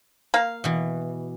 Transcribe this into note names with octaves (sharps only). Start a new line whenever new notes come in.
A#3 F5
B2 E3